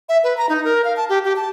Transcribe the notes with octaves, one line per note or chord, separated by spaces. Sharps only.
E5
B4
A#5
D#4
A#4
F5
A5
G4
G4
A5